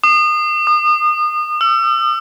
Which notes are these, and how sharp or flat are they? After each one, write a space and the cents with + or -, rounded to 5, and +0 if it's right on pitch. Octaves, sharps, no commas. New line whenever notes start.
D#6 -30
D#6 -40
E6 +35